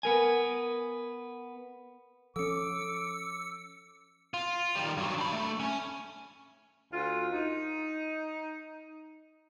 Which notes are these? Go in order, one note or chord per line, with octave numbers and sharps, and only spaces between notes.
B3 A#4 G#5
F3 C#4 A4 D6 E6 C#7
F4
D#3 G3
G2 F#3
D4 B5
A3
C#4
D2 F4
D#4